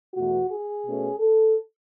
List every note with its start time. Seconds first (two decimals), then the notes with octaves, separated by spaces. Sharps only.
0.14 E2 B2 A3 F#4
0.50 G#4
0.84 B2 A3 C#4
1.19 A4